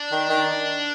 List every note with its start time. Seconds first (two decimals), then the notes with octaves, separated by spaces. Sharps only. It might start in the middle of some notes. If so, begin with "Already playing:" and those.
Already playing: D4
0.12 D#3
0.30 D#3